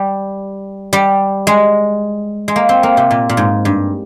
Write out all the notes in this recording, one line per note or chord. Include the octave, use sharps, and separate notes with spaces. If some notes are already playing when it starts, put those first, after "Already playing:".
Already playing: G3
G3
G#3
G#3
A#3
C4
A#3
C3
A#2
A#2
G#2
G2